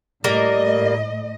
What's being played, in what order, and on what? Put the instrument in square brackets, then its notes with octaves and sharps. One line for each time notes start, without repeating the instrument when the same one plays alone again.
[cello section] A2 D#5 [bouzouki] G3 A#3 A#4